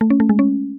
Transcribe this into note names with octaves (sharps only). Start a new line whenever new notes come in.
A3
C#4
A3
G#3
C#4